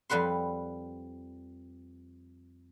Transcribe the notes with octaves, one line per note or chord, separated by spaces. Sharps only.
F2 G3 B4 F#5 C6